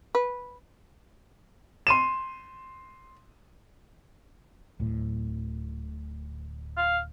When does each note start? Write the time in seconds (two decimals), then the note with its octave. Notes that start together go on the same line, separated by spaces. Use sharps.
0.15 B4
1.87 C6 D#7 E7
4.80 D1 A2
6.77 F5